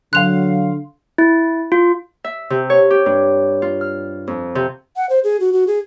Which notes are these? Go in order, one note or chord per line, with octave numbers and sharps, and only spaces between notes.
D3 F#3 F5 C6 F#6 F7
E4
F4
E5
C3
C#5
G4
G2
F4
F6
F2
C3
F#5
C5
G#4
F#4
F#4
G#4